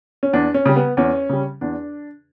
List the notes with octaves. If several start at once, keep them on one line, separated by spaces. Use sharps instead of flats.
C#4
E2 D4
C#4
C#3 G3
B3
E2 C#4
C#3 G3
E2 D4